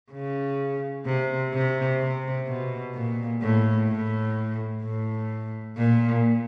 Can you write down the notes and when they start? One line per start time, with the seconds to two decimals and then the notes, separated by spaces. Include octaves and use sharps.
0.12 C#3
1.06 C3
1.53 C3
2.00 C3
2.47 B2
2.94 A#2
3.41 A2
3.88 A2
4.83 A2
5.77 A#2